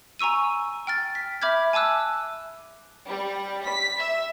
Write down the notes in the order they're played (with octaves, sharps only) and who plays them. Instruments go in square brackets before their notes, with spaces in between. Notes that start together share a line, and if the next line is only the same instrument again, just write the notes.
[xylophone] G#5 A#5 C#6 E6 D#7
G5 F6 A6
B6
E5 B5 D6 F6 G6 G#6
G#5 A5 D6 E6 F#6
[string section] G3
B6
E5